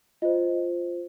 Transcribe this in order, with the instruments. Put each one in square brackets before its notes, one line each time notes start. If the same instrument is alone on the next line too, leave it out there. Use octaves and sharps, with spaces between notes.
[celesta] F4 C5 D#5